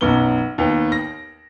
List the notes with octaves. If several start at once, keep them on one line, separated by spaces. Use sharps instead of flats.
B1 F#2 B3 G7
D#2 B3
A#6